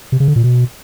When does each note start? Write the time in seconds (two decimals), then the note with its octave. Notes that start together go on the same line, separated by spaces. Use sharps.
0.12 C3
0.20 C#3
0.28 D3
0.36 A#2
0.44 B2